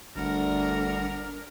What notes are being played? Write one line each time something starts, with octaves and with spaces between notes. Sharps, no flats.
G1 D2 G3 D4 A#4 F#5